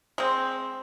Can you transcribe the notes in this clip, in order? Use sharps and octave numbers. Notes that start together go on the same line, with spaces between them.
G#3 C4